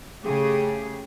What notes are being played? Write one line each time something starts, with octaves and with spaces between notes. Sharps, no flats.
C#3 A3 G4 G#4